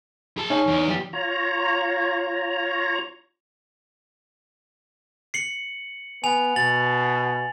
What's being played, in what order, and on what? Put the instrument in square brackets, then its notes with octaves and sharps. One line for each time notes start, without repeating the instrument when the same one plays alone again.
[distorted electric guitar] G#4 A5
[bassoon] C#4 [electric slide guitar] D#4
[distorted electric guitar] E2
[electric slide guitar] G3 G4
[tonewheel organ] F4 C#5 A#5
[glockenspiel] C7 C#7 F#7
[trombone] B3 [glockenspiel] G#5 F7
[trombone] B2 [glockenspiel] A6 F#7